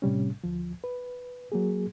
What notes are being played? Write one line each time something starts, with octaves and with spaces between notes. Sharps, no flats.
A2 C3 G3 C#4
D2 F3
B4
F#3 A#3 G#4